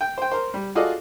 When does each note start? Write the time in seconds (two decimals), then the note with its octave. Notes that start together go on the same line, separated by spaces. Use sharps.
0.01 G5
0.18 C5 G5
0.32 A#4 C5
0.54 G3
0.75 F4 F#4 G#4 A4 D5 D#5